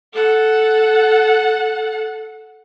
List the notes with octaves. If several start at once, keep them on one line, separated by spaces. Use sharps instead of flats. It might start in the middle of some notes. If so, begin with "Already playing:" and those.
A4 F#5